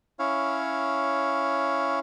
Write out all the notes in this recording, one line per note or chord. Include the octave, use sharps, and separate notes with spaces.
C#4 E4 C#5 F5